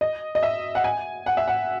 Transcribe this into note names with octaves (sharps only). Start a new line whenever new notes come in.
D#5
D#5
E5
F#5
G#5
F#5
E5
F#5